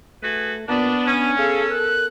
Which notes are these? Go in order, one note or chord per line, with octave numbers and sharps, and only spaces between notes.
A3 F#4 G#4 B4
A#2 B3 D4
C#4 D4 D#7
G#4 A4 F5
A#4 F#6